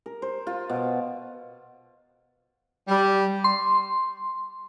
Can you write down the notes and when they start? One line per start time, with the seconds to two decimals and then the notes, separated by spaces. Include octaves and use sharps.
0.06 A#4
0.22 C5
0.47 F4
0.70 B2
2.88 G3
3.44 C6